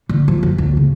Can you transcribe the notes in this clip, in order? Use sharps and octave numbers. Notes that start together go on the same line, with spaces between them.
D3
F3
F#2
D2
C#3